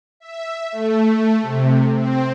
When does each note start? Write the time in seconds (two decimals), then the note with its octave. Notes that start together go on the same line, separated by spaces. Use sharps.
0.20 E5
0.72 A3
1.42 C3
1.95 C4